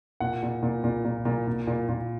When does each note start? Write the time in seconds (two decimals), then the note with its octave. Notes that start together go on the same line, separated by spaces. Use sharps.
0.20 A#2 F#5
0.43 A#2
0.63 A#2
0.84 A#2
1.04 A#2
1.25 A#2
1.47 A#2
1.67 A#2
1.89 A#2